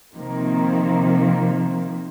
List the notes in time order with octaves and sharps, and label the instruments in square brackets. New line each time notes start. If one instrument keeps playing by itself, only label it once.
[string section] C3 D#3 F3 A#3